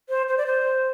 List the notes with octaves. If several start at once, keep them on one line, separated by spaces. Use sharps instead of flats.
C5
C5
D5
C5